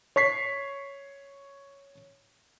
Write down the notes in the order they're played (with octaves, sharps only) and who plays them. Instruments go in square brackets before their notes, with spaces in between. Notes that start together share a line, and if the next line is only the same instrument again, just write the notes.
[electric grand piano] C#5 C#6 B6 C7